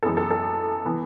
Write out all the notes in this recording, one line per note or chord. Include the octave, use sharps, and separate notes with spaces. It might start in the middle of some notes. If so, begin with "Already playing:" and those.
F#2 E3 G#3 B3 A4
A4
A4
E3 B3